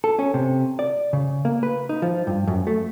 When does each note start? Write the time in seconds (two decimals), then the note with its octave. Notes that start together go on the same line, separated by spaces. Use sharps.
0.04 A4
0.19 C#4
0.34 C3
0.79 D5
1.13 C#3
1.45 A#3
1.63 B4
1.89 D#4
2.02 F3
2.27 G2
2.47 F#2
2.67 A3